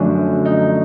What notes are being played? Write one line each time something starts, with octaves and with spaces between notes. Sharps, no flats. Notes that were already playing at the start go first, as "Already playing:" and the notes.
Already playing: F#2 D3 F3 A3 D4
D#4